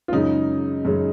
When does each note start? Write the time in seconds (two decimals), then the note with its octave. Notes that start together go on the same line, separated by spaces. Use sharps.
0.08 F4
0.12 F#2 C#3 G#3 D#4
0.85 F#2 C#3 G#3